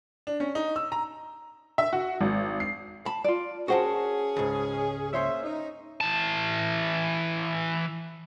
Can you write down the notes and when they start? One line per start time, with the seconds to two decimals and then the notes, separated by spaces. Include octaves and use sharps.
0.27 D4
0.40 C#4
0.55 D#4
0.76 E6
0.92 A#5
1.78 E5
1.93 F#4
2.21 G#1
2.60 C7
3.06 A5 B5
3.24 F4 D5
3.68 C#4 F#4 G#4 A#4 C5 F#5 G5 A5
4.37 C#2 G#2
5.13 A#3 C#4 G#4 C5 C#5 E5
5.43 D#4
6.01 E3 A5